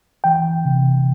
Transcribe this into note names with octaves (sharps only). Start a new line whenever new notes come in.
E3 G5
C3